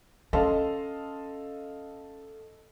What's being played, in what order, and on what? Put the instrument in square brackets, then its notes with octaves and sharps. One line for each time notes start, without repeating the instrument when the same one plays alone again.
[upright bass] C#4 [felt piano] A4 F5 [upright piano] D#5 A5 C6